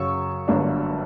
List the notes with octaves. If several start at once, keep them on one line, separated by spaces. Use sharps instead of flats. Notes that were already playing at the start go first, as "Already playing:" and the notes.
Already playing: F#2 C#3 F#3 C#6 E6
G1 G2 F#3 A#3 D4